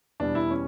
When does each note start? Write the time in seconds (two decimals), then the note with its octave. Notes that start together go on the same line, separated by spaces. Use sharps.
0.20 E2 B2 G3 D4
0.35 E4
0.50 C#4